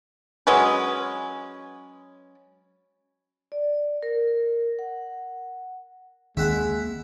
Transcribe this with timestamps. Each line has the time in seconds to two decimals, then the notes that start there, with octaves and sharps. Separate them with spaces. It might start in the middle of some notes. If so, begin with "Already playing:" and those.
0.47 F#3 G#3 C#4 B4
3.52 D5
4.03 A#4
4.79 F#5
6.37 D#2 D#3 G#3 A#3 E5 F#5 B5